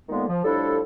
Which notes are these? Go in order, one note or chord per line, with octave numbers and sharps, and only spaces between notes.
F2 A#2 D#3 G#3 A#3 B3
F3
A2 F3 G3 D4 E4 A4